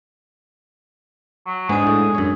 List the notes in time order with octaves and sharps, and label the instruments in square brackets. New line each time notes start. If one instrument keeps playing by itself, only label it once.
[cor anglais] F#3
[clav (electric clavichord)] G#2 B3 [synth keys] G#3 D4 [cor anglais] G#4
[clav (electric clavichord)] A2
F#2 C#5